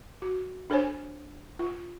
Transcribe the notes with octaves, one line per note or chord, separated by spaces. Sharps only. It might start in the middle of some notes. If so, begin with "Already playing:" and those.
F#4
D4 A4 C5 C#5 G#5
F4